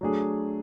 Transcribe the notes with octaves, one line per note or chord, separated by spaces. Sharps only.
F#3 A3 D4 G#4